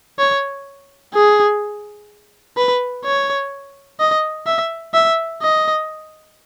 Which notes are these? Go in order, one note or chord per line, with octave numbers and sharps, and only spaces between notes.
C#5
G#4
B4
C#5
D#5
E5
E5
D#5